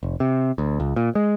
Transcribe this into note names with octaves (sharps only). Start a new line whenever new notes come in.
F1
C3
D2
C#2
A#2
G#3